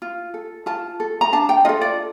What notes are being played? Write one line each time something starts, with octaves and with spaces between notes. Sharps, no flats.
F4
A4
F4 A5
A4
A#5
D4 A5
G5
F4 A4 D#5
D5